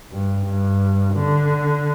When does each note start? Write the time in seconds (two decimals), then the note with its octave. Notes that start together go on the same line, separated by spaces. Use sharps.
0.12 G2
0.46 G2
1.15 D3